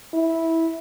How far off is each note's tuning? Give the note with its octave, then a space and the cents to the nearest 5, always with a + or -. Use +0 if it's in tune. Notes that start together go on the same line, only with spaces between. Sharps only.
E4 -10